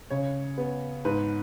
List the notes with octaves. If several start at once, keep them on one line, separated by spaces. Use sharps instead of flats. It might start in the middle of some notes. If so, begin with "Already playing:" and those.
C#3 C#5
B3
G#2 B4